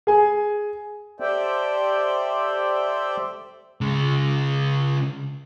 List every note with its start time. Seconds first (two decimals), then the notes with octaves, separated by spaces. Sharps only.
0.07 G#4 G#5
1.20 G4 A4 C5 D5 E5 G5
3.81 C#3 G#3